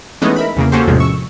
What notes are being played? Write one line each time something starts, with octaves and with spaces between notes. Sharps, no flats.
E3 G#3 A3 B3 C#4 D#4
A#4 E5 B5
E2 C#3 A#3
A#3 C#4 F#4 G4 A4 C5
A1 E2 C3 F3 G#3
C#6 E6